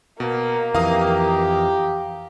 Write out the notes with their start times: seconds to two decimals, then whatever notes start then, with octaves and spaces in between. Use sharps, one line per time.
0.20 B2 A#3
0.75 F2 E3 G4 F5 A#5 D#6